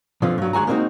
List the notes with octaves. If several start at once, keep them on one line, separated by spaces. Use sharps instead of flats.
B2 D3 F3 C4 F4
G2 F#3
D2 G#3 F#4 G#5 A#5
G#3 A#3 C4 D4 D#4 F#4